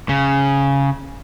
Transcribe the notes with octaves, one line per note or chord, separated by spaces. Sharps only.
C#3